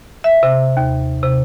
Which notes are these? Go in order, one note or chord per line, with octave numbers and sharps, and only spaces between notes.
E5
C3
D#2
C3